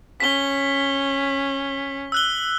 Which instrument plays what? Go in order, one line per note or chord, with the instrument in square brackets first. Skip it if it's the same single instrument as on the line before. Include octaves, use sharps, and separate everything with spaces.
[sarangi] C#4 [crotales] B6 G7
[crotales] E6 F#6 G7